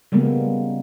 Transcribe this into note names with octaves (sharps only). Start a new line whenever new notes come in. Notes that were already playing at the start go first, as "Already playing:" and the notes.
C#3 G3 G#3 A#3 B3